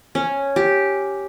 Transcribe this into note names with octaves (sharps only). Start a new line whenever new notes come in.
C#4
G4